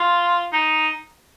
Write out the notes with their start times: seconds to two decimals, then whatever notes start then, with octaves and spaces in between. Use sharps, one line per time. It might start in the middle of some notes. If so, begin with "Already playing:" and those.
Already playing: F4
0.53 D#4